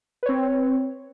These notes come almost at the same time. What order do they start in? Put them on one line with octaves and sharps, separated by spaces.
B4 C#5 C4